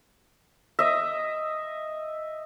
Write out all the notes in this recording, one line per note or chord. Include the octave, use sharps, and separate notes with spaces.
D#5 E5